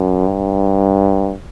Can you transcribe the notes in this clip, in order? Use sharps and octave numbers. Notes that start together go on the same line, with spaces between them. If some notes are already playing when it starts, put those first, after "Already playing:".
Already playing: F#2
G2